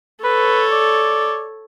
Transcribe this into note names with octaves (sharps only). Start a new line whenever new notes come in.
A4 B4 C#5
D5